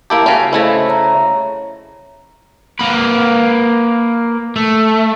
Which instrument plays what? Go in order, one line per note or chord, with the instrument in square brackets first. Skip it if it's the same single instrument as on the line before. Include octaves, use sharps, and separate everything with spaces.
[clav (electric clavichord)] A#3 E4 G4 [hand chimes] A5 D7
[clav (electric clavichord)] C#3 C#4 [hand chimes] F#4
[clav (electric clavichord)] C#3 A3 E4 [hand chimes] C5 D#5 E5
[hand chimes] C#5 A#5
[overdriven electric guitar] A#3 B4
A3